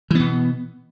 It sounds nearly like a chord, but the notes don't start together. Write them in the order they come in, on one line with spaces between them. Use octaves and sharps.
E3 B3 B2